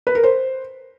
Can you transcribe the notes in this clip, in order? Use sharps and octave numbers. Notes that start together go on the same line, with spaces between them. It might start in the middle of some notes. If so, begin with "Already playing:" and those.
B4
A#4
C5